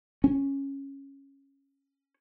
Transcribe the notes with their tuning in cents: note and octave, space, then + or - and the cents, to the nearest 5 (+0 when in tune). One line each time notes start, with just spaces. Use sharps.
C#4 -10